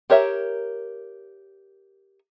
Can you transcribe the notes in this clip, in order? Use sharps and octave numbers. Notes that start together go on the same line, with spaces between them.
G4 A#4 C#5 E5